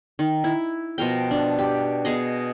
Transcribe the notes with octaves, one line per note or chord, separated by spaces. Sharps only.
D#3
E4
B2 F3 A#4 G5
D4
G4
B2 G#4 D#5